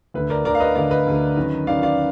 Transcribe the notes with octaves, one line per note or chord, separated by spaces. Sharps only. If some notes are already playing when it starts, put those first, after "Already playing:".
D2 D3 B4
A#4 D5
D2 D3 A#4 D5
F5
B4 D#5
D2 D3 D5 F5
B4 D#5
D2 D3
F#2 D#3
F#2 D#3 D5 F5
D5 F5